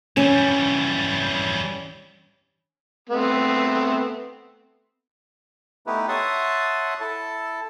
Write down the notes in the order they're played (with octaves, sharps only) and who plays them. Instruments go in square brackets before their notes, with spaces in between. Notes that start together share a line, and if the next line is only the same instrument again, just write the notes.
[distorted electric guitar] E3 G3 [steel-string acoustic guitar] C#4
[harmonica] A3 B3 C4
[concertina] A3 B3 D#4 E4 G4 B4
C#5 E5 F#5 A5 C6 D#6
E4 A4 A5